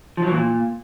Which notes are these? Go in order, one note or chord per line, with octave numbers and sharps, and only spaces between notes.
F3
F#3
E3
A#2